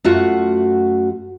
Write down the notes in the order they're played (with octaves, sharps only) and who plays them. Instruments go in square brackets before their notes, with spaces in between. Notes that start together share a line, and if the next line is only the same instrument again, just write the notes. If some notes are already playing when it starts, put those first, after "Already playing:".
[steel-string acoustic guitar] F#2 A3 F4 F#4 F#5